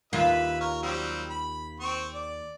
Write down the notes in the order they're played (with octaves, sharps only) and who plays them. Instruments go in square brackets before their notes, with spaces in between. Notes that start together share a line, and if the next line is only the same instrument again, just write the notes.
[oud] D#2 F4 [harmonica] B4 E5
[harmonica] A#4 C#5
F#3 G3 C4
B5
C4 C#6
D5